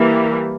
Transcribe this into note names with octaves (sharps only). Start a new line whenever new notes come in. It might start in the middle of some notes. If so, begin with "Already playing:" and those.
Already playing: E3 G3 A#3